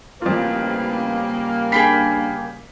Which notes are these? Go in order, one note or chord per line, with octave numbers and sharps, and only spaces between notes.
A1 F2 C#3 G3 A#3 F4 B4
D4 G#4 G5 B5 B6 C7